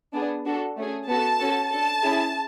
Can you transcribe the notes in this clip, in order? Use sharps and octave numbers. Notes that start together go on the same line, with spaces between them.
B3 D4 G#4
D4 F#4 A4
A3 C#4 G#4
B3 F#4 A4 A5
C#4 F#4 A4
D4 A4 A5
C#4 E4 G#4